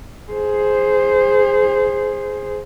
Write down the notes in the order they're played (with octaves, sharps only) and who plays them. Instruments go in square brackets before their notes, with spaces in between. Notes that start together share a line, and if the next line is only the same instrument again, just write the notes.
[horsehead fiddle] G#4 C5